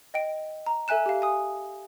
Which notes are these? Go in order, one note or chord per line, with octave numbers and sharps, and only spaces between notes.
D#5 G5 D7
A#5
A4 E5 G#5 F#6 E7
G4 F5
G#5 D#6